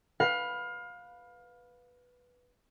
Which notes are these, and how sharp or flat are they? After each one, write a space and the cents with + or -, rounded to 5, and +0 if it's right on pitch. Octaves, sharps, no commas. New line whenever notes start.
B4 +0 F5 +25